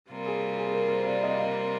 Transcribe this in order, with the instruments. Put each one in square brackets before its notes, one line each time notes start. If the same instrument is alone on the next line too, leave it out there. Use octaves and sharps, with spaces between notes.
[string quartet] C3 G3 A#3 F4
[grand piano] G#4
G#4
A#4
C5
D5
D#5
F5